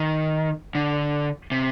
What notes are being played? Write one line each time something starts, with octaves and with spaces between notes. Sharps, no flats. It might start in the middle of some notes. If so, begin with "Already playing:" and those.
Already playing: D#3
D3
C3